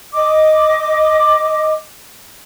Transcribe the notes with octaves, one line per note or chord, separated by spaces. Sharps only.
D#5 D6